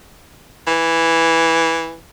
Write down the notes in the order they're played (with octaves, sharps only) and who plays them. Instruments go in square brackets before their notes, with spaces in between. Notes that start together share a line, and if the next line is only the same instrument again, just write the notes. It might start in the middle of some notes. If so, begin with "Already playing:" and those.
[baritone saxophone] E3